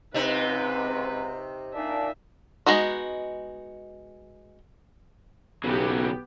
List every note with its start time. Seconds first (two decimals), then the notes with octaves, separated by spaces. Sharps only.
0.14 C#2 G#2 C3 C4 D#4 B4
1.74 A#2 D4 D#4 E5
2.66 G#3 B3 D#4 F#4
5.64 B1 C#3 E3 F#3 B3 G4